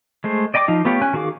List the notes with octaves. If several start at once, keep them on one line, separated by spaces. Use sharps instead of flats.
G#3 A3 C5
D5 D#5 G5 B5 D6
F3 D#4 F5
A3 B3 F4 G4 C#5
C#4 G#5 F#6
D#3 F#4 G#4 F5 D6